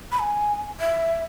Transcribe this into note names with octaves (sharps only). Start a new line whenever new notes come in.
B5
G#5
E5